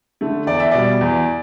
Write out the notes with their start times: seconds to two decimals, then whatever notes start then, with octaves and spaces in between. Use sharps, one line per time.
0.21 D3 A3
0.47 E2 D5
0.60 E5
0.71 B2 G3 D5
1.01 E2